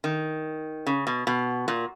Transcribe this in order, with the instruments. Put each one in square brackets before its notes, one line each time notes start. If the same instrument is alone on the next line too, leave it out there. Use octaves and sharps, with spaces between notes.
[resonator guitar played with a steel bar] D#3
C#3
B2
B2
A#2